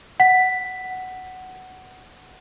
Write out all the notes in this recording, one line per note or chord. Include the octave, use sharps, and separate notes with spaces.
F#5 B6